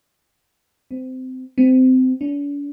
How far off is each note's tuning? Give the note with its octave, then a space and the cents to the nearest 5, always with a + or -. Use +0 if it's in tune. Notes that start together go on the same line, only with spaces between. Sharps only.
C4 -25
C4 -25
D4 -45